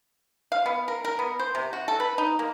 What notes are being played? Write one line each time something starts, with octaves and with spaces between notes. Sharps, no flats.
F5
B3
A#4
A#4
B3
C5
C3
F#4
A4
B4
D#4
A#3